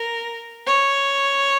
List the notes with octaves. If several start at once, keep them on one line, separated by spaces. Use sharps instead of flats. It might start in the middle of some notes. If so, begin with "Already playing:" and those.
Already playing: A#4
C#5